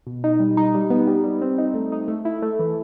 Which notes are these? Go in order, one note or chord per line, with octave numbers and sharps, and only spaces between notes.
B2
D#4
G3
D#4
G3
B3
G3
G3
C4
D#4
A3
D#4
A3
E4
A3
E3